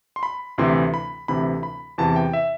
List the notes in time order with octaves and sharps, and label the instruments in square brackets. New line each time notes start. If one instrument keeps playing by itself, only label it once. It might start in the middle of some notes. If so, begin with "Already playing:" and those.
[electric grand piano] C6
B5
D2 C3 E3 C6
B5
D2 C3 E3 B5
B5
E2 C3 E3 A5
G5
E5